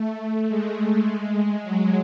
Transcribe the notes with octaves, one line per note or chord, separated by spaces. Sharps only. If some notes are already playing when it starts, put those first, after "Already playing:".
Already playing: A3
A3
G#3
F#3